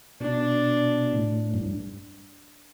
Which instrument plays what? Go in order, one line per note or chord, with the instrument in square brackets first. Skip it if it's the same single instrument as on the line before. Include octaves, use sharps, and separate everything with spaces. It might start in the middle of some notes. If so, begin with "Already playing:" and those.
[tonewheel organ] B2 [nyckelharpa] D4
[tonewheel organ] A2
F#2
G2